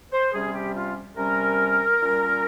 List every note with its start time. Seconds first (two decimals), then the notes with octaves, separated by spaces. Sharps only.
0.12 C5
0.32 C3 G3 C#4 G#4
0.54 G4
0.75 F4
1.16 C3 G3 C#4 A#4
1.99 A#2 G3 C#4